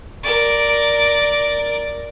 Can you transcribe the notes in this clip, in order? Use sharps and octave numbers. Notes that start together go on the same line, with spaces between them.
A#4 D5